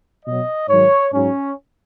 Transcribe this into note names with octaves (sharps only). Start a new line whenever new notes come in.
B2 F#3 D#5
G#2 D#3 F#3 C#5
G#2 F#3 C#4